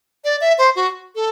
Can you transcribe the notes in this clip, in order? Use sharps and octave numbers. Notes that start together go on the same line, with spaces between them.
D5
E5
C5
F#4
A4